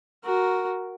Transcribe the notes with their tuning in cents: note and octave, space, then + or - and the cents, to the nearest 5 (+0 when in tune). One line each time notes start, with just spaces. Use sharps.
F#4 +0 A#4 +0